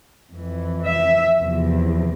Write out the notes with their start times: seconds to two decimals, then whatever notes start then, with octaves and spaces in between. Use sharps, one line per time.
0.35 F2 E3
0.88 E5
1.40 E2 C3 F3